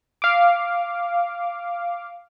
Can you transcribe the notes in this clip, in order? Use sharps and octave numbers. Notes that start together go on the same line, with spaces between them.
F5 D6